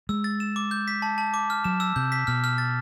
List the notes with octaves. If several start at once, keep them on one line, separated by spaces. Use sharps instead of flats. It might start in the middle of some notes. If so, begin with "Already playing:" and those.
G#3 E6
A6
E7
D6
G6
B6
A5
A5
D6
F6
F#3 E7
E6
C3 G6
B6
B2 F6
F6
A6